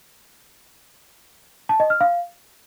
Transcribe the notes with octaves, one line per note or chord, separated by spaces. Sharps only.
A5
D#5
F6
F5